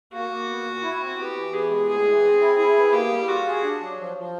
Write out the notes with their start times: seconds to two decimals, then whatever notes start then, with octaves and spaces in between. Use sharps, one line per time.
0.13 A#3 F#4
0.30 A#3
0.49 B3
0.66 A#2
0.82 E4
1.00 C4
1.18 B3 G4
1.36 E3
1.53 B3 G#4
1.70 G#3
1.89 A2 G#4
2.06 E3
2.23 C4
2.41 E4
2.58 E4 G#4
2.76 B3
2.93 A#3 G4
3.11 G3
3.28 F4 F#4
3.46 G#4
3.63 D4
3.81 F#3
3.98 F3
4.17 F3